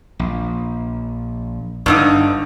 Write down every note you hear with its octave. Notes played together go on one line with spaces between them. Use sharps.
A#1
G1 G2 D3 D4 D#4